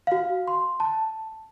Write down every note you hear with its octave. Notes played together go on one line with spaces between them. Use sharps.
F#4 F5
C6
A5